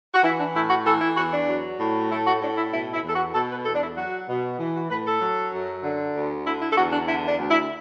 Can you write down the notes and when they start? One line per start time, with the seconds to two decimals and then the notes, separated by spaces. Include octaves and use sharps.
0.14 F#4
0.23 E3 E4
0.39 D4
0.54 A2 E4
0.70 F#4
0.86 E3 A4
1.01 E4
1.17 E2 F#4
1.33 D4
1.49 F#3
1.80 A2
2.11 A3 E4
2.26 F#4
2.42 A2 D4
2.57 E4
2.73 B2 E4
2.93 E4
3.04 E2 A4
3.14 F#4
3.34 B2 A4
3.50 B4
3.65 E2 A4
3.74 D4
3.82 E4
3.97 F#3 F#4
4.29 B2
4.59 E3
4.74 F#4
4.90 A2 B4
5.06 A4
5.21 F#3
5.53 F#2
5.83 D3
6.14 D2
6.46 D3 E4
6.61 E4
6.71 A4
6.77 E2 F#4
6.92 D4
7.08 D3 E4
7.28 D4
7.39 D2
7.50 E4